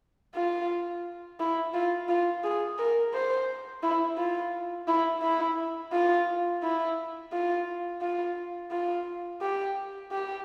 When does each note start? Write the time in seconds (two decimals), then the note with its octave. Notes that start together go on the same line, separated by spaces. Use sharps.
0.35 F4
1.40 E4
1.74 F4
2.09 F4
2.44 G#4
2.78 A#4
3.14 C5
3.83 E4
4.18 F4
4.87 E4
5.22 E4
5.93 F4
6.62 E4
7.32 F4
8.01 F4
8.71 F4
9.42 G4
10.12 G4